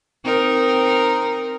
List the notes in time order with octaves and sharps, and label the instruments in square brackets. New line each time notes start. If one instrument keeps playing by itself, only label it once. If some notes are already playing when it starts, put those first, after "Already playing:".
[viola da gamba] C4 D#4 A#4